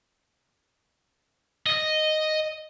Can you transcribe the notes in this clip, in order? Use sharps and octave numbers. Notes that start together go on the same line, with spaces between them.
D#5